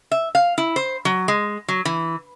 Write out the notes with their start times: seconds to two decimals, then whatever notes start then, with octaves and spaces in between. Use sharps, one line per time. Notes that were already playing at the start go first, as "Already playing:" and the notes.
0.11 E5
0.35 F5
0.58 E4
0.76 C5
1.05 F#3
1.28 G#3
1.68 F#3
1.85 E3